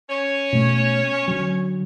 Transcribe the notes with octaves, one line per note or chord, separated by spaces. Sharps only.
C#4 C#5
B2 A3
D3 F#3